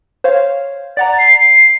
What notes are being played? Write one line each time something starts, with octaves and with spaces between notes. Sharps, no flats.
C5 C#5 F5
D5 F#5 A#5 A6
C7
C7